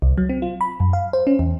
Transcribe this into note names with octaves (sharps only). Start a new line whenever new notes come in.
C2
F#3
C4
F4
B5
F#2
F5
C5
C#4
E2